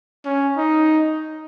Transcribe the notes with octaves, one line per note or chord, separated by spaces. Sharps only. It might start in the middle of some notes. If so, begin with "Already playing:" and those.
C#4
D#4